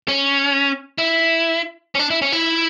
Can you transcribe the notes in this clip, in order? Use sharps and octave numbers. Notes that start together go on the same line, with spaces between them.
C#4
E4
C#4
D4
E4
C#4
E4